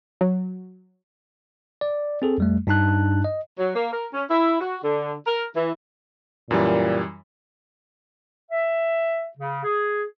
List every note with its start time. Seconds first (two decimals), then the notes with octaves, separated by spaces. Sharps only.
0.21 F#3
1.81 D5
2.22 C4 G#4 A4
2.38 F2 G3 A3
2.67 G2 D4 D#4 A5 F#6
3.24 D#5
3.59 F#3
3.75 A#3
3.93 A#4
4.13 C#4
4.30 E4
4.61 F#4
4.83 D3
5.26 A#4
5.56 E3
6.51 F#2 A#2 E3 G3
8.49 E5
9.37 C#3
9.64 G#4